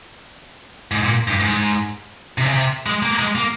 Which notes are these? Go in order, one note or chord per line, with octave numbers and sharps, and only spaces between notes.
G#2
A#2
G2
G#2
C3
C#3
C3
G#3
A#3
G#3
A#3